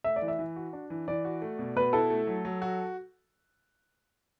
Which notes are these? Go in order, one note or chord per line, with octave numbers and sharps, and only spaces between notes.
A3 E5
D5
E3
E5
E3
F#4
D4
E3
E3 D5
F#4
A3
B2
B2 B4
E4 A4
A3
F#3
F#3
F#4